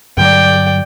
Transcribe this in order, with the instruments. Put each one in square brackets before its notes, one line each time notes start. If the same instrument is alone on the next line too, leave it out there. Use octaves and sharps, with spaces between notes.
[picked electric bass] G2 D3 F#3 [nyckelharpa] D5 G5